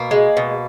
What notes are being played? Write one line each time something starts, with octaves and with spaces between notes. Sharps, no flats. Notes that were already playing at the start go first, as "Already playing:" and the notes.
Already playing: B2 A#3
G#3
B2